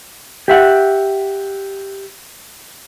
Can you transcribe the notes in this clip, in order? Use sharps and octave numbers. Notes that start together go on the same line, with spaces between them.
G4 E5 F#5